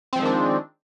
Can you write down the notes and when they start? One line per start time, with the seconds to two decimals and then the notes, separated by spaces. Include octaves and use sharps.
0.13 C4
0.16 F3
0.19 G#3
0.22 D#3
0.25 D4